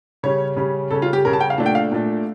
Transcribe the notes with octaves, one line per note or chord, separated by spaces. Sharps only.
C#3 G3 C#4 C#5
C#3 G3 C#4
C#3 G3 C#4 A4
F4
G4
C#3 G3 C#4 A#4
A5
G5
F5
A#2 A3 D4 A5
G5
F5
A#2 A3 D4